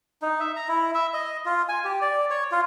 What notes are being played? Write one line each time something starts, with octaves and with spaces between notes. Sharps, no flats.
D#4
E5
A#5
E4
E5
D#5
F4
G#5
G4
D5
C#5
F4